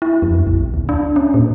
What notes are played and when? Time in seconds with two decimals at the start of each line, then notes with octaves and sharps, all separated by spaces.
0.02 E4
0.22 F2
0.47 A#1
0.74 D2
0.89 D4
1.16 C#4
1.34 A#2